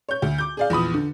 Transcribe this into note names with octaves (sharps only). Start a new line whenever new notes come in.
C#5 G6
D2
D6 G6
G#4 D5 F5
A#1 E2 B5 D#6
D3